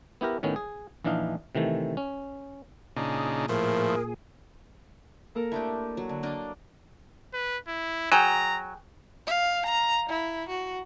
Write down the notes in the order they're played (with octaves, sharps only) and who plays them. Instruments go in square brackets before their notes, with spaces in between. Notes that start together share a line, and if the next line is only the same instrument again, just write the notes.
[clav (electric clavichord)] B3 E4 G4 A#4
A2 D#3 B3 C#4
G#4
A#1 E3 D4 D#4 F5
C3 D#3 E3 A3
C#4
[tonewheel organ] A#2 G#4 [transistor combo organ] C#3 D4 D#4
[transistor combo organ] A2 F3 [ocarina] A#4
[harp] A#3 A4 A#4
[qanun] A3 D4 G4 [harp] E4 D#5
[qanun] F#3
D3
A#3 D4 D#5
[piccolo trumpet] B4
E4
[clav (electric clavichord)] F#3 [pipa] G#4 G5 [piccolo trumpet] A#5
[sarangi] F5
A#5
E4
F#4